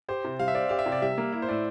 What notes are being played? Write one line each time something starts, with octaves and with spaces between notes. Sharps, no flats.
G4 C5
C3
G3 F5
E5
C4 D5
G4 F5
E5
C3
D5
G3 E5
A#3
E4
C5
A2 D5